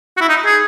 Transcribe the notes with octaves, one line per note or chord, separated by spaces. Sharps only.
F#4
E4
D#4
G#4